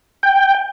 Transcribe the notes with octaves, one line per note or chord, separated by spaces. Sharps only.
G5